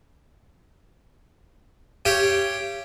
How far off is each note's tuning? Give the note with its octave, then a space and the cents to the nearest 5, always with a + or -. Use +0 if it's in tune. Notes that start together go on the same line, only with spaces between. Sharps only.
G4 +0 C#5 +0 F5 -40